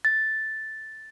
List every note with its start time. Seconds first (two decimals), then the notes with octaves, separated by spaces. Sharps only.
0.05 A6